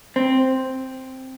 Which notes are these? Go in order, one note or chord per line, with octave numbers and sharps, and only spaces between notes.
C4